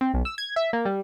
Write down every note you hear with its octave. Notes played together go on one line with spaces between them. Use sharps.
C4
B1
E6
G#6
E5
A#3
G3